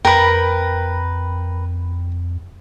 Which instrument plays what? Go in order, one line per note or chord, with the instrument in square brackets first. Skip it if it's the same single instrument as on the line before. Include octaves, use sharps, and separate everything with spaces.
[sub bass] F2 [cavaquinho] A#4 B4 [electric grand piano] G5 B5